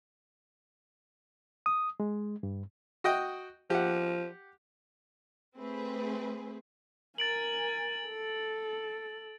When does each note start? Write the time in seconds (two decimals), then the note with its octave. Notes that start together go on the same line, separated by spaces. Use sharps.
1.66 D#6
2.00 G#3
2.43 G2
3.04 F#4 D#5 G5
3.70 F3 G4 F#5
5.58 A3 C4 G#4 B4
7.18 A#4 G#5 A6 D7 F#7
8.07 A4